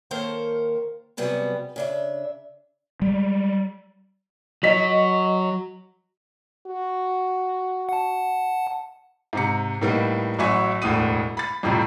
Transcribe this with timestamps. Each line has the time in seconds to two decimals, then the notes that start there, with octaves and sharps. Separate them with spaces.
0.11 D#3 A#3 A4 A#4 C5 C#5
1.17 C3 F#3 G3 B3 G#4 B4
1.76 C#3 D4 E5
3.02 G3 G#3
4.63 F#3 D#5 B6
6.67 F#4
7.89 F#5 A5
9.33 G#2 C3 C#7
9.81 A2 G3 A#3 B3 D#4
10.39 A1 F#3 F#4 E5 G#5 C#6
10.82 E1 D2 A2 D#6 D#7
11.37 B5 A6
11.63 F2 A2 C3 F3 G3